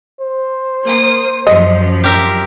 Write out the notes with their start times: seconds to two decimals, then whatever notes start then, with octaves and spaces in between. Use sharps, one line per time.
0.21 C5
0.85 A#3 D#6
1.47 F#2 F3 D#5
2.04 G4 A#4 E5